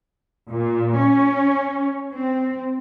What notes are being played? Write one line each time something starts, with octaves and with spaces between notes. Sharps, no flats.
A#2
C#4
C4